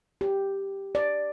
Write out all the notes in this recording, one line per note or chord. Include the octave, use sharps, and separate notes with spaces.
G4
D5